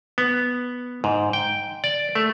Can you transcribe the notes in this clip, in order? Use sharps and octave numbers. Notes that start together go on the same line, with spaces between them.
B3
G#2
G5
D5
A3